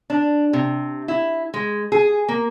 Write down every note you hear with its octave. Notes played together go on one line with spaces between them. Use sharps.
D4
C3
E4
G#3
G#4
A#3